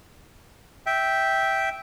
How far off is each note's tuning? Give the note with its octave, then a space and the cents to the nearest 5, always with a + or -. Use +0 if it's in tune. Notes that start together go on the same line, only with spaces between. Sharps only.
E5 -10 G5 -5